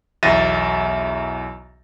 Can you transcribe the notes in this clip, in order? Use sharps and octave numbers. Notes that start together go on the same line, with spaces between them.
B1 E2 E5 A6 A#6 D#7